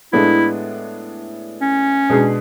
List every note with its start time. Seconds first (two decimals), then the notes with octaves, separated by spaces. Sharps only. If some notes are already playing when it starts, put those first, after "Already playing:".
0.13 A2 G#3 B3 D4 E4
1.61 C#4
2.10 B2 G#3 D4 G#4